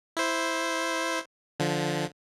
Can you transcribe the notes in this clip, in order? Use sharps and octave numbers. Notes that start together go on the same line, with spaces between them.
E4 C5
D3 F3